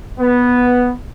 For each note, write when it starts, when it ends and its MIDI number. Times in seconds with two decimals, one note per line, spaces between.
0.20 0.92 59